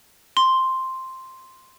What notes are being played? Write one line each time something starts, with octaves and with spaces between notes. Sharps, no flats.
C6